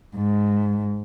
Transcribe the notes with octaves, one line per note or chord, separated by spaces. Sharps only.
G#2